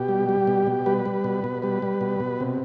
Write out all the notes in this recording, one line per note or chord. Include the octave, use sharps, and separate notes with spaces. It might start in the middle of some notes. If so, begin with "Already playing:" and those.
Already playing: B2 G4
G3
G3
B2
B2
G3 B4
G3
B2
B2
G3 B4
G3
B2
B2
C3